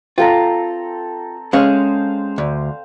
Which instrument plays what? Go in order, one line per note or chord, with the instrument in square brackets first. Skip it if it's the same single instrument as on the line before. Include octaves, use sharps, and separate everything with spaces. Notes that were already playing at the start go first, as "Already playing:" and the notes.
[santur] C4 A4 A#5 [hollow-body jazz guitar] F4
[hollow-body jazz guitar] G#3 C#4 [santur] C5 F5
[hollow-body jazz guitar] D2